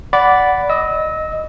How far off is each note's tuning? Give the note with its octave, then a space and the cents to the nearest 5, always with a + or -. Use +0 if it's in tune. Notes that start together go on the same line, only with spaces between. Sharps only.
D5 -10 F#5 +0 B5 +0
D#5 +0 E6 -30